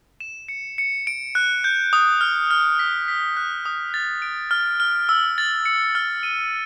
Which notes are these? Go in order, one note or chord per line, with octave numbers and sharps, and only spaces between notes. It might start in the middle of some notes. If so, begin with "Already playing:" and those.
E7
C#7
C#7
D7
F#6
G6
D#6
F6
F6
B6
B6
F#6
D#6
A6
D7
F6
F6
E6
A6
C#7
F6
D#7